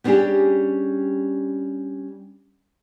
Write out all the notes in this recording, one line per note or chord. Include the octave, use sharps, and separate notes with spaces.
G3 B3 C#4 D4 G4 G#4